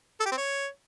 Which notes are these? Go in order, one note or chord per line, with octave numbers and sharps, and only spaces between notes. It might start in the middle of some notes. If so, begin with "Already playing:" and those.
A4
G4
C4
C#5